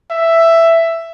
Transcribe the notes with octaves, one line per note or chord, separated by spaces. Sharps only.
E5